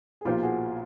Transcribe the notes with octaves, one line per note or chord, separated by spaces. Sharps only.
G#4
B1 A#2 F3 F4 G4
F#4 G#4